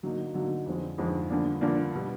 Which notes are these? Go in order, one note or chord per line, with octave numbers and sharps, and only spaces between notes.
D3 F#3 A#3 D#4
D3 F#3 A#3 D#4
F2 D3 F3 G#3 C4
F2 D3 F3 G#3 C4
G2 D3 F3 A#3 D4
G2 D3 F3 A#3 D4
B2 G3